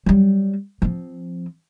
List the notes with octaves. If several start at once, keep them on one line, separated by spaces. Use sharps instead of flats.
F#3 G3
F3 C4